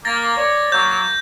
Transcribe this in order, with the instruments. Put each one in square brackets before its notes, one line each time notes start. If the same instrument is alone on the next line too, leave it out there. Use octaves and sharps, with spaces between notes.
[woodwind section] A#3 [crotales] A6 A#6
[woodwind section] C#5 D5
[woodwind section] F#3 A#3 [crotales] G6